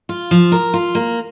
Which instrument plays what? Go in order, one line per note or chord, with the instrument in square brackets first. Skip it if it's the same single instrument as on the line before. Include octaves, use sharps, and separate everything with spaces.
[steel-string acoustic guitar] F4
F3
A#4
F4
A#3